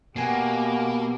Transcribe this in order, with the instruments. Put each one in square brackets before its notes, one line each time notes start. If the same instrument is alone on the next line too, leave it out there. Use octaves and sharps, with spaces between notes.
[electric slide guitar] B2 [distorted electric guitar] A#3 [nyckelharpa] G4 [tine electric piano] F#5 G#5 C7